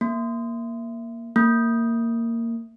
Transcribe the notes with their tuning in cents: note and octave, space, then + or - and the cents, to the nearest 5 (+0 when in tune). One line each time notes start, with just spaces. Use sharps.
A#3 +5
A#3 -15